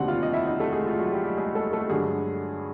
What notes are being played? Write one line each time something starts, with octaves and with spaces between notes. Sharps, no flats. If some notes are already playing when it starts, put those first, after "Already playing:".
Already playing: F1 D#2 D3 G3 C4 F#4 F#5
F4 F5
D#5
E4 E5
D#4 D#5
A3 A4
G#3 G#4
F4
F#3 F#4
G3 G4
G3 G4
G#3 G#4
A3 A4
A3 A4
G2 D3 F#3 G#3 G#4